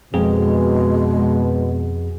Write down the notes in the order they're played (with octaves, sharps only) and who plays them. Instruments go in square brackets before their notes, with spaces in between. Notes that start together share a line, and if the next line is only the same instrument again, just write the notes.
[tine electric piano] F2 G#4 [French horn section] B2 [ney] G#3